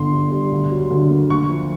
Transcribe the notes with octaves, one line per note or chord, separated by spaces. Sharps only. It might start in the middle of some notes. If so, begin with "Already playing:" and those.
Already playing: G1 D3 C6
G2
G3
D2
F#3
D3
A#3
D2 C#6
F3